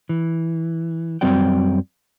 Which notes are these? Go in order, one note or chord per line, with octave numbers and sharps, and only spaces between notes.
E3
F#2 G3 C4 F#4 D5 G5